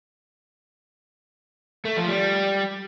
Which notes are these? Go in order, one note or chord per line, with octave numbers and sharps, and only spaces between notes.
A3
F3
G3